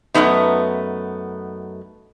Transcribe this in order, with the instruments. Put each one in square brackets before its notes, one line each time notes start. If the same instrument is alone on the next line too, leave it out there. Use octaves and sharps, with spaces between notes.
[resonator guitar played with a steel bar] F#2 C3 A3 B3 D#4